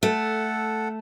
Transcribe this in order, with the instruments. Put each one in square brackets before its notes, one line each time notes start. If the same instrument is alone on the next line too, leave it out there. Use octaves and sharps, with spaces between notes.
[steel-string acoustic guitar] A3 [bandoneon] A4 F#5